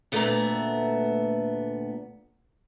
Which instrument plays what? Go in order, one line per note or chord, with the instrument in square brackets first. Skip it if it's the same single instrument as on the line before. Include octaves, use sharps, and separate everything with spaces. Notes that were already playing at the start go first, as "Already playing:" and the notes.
[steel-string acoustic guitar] D2 A#2 A3 B3 E5 A#5